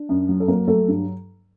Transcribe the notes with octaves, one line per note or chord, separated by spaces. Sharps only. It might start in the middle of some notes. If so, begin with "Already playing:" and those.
Already playing: D4
F#2
F#3
A4
F#3 A#3 A#4
F#3 A3 A4
G2